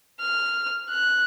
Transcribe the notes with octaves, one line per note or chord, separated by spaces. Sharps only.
F6
F#6